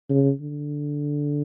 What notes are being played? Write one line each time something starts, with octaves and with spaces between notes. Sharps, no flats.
C#3
D3